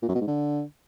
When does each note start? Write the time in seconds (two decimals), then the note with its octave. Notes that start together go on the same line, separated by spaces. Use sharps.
0.02 A#2
0.09 F#2
0.15 B2
0.21 G#2
0.27 D3